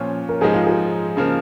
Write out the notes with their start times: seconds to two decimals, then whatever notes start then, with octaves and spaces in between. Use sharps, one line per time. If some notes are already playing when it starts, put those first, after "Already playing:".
Already playing: A#2 F3 C#4 F4 C#5
0.29 A#4
0.41 G#2 F3 G#3 D#4 G#4
0.54 F4
0.67 G#4
1.17 C#3 F3 A#3